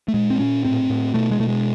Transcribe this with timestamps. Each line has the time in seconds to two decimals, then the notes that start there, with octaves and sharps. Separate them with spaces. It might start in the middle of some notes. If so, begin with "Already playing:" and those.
0.08 A3
0.14 A#2 G#3
0.30 C4
0.39 A#2 C#4
0.65 A2 C4
0.90 A2
1.14 B2 A3
1.31 G#3
1.40 B2 A3
1.48 G#3